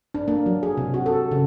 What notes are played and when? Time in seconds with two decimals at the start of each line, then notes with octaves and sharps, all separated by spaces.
0.14 D4
0.28 A#3
0.46 F#3
0.63 G#4
0.77 C3
0.94 F#4
1.06 A4
1.32 C#3